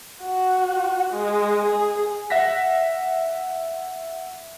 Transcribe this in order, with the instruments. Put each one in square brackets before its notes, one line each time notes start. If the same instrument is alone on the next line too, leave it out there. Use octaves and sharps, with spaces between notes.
[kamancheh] F#4
G#3
G#4
[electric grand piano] E5 F#5 A#6 B6